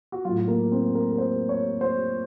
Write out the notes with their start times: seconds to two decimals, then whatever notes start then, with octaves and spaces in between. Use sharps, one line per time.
0.12 F#4
0.25 A2 F#3 F4
0.48 A#3
0.72 C4
0.95 A#4
1.12 A#4
1.18 C5
1.49 C#5
1.81 C5